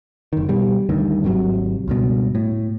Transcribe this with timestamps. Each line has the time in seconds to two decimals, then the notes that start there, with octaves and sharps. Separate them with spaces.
0.33 F#1 D#3
0.49 B2 G3
0.89 D2 G2 D#3
1.24 G#1 C3 D#3 F#3
1.88 C#2 G2 B2
2.35 A2